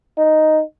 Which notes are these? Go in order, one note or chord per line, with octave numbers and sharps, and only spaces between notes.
D#4